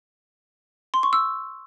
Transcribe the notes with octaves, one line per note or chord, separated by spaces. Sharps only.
C6
C#6
E6